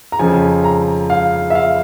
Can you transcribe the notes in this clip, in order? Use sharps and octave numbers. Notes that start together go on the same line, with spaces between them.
A#5
F2 C#3 F3 G#5
A#5
F5
E5
F5